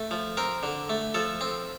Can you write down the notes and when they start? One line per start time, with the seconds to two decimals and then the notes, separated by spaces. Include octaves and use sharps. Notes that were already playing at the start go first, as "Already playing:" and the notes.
Already playing: A3
0.11 F3
0.37 C4 A#4
0.63 D3
0.90 A3
1.14 F3 A4
1.41 C4